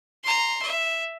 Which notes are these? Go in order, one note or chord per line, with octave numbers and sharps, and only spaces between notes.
A#5 C6
E5